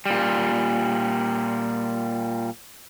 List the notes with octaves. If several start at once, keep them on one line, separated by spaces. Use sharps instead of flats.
A#2 G3